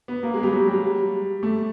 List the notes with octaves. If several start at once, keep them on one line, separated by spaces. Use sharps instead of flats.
B3
A#3
G#3
G3
F#3
G3
A3